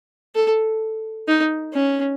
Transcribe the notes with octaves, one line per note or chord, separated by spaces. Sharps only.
A4
D#4
C#4